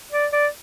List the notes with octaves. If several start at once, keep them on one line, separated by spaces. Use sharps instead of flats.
D5
D5